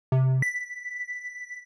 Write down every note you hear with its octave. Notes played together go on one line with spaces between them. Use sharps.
C3
B6